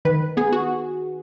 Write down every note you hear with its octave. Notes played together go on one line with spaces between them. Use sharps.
D#3 B4
B3 G#4
F#4